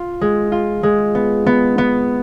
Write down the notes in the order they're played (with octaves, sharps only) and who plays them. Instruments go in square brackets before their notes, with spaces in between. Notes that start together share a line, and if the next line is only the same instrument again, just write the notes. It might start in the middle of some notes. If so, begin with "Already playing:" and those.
Already playing: [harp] F4
G#3
F4
G#3
B3
B3
B3